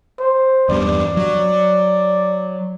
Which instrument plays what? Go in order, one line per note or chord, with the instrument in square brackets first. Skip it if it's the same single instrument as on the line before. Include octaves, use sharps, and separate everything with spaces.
[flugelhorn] C5
[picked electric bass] E2 G2 [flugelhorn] D5
[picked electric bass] F#3